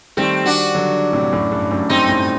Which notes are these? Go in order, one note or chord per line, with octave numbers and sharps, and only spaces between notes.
D#3 G3 A3 C4
D4 F#4
D3 F#3
A2 C3
F#2 A2
G2
F#2 A2
G2 C4 D#4
F#2 A2